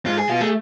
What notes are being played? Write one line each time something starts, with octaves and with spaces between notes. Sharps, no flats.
G#2 F4
G#4
B2 F4
A3 G#4